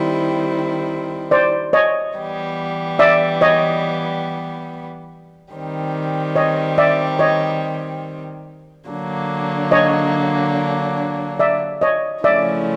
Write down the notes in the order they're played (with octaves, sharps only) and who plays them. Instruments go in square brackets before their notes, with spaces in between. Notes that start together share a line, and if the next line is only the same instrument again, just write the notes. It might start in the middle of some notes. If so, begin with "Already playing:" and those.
Already playing: [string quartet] D#3 G3 C4 E4
[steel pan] C5 D5
C#5 D#5
[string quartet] E3 G3 B3
[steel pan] D5 E5
C#5 D#5
[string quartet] D#3 G3 C4
[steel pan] C#5 D#5
D5 E5
C#5 D#5
[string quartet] D3 F#3 A#3 D4
[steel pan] C#5 D#5
D5 E5
C#5 D#5
[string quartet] C#3 F3 A3 C#4 E4 [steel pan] D5 E5